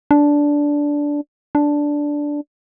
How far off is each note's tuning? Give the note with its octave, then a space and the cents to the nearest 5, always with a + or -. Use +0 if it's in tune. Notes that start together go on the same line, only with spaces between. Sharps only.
D4 -10
D4 -5